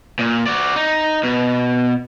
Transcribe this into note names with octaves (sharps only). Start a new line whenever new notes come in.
A#2
F#4 D5
D#4
B2